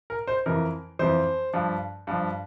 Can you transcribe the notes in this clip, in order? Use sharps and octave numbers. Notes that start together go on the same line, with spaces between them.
A#4
C5
F2 E3 A#4
F2 E3 C5
G2 F3
G2 F3